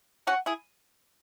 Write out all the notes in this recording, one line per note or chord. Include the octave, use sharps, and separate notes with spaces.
C#4 F#4 F#5
E4 G#4